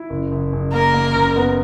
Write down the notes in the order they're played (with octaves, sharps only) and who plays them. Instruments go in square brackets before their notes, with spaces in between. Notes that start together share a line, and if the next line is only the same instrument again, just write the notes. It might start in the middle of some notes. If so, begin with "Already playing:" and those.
Already playing: [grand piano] E4
F#1
F#1
F#1
[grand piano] A#3 [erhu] A#4
[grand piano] A#3
F#1
B3